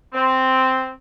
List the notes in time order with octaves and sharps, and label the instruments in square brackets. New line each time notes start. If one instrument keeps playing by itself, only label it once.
[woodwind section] C4